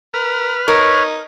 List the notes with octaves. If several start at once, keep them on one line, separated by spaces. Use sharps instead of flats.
A#4 B4 F6
D#4 A#4 C#5